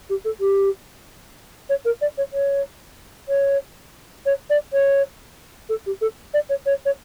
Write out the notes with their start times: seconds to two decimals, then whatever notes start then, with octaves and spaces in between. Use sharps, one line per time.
0.09 G4
0.24 A4
0.40 G4
1.69 C#5
1.85 A#4
2.01 D5
2.17 C#5
2.33 C#5
3.28 C#5
4.26 C#5
4.50 D5
4.73 C#5
5.69 A4
5.86 G4
6.01 A4
6.34 D5
6.49 C#5
6.66 C#5
6.85 C#5